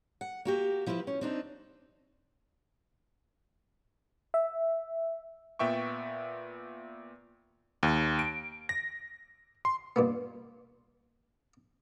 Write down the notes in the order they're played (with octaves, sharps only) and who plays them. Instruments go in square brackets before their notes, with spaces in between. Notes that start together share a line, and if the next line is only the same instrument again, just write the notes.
[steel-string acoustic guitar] F#5
A#3 F#4 G4
F3 E4 F4 A#4 B4
C#4
C4 D4 D#4
[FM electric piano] E5
[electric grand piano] A#2 B3 E5 G5 C#6
D#2
D7
A#6
C6
[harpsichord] G2 A#2 B3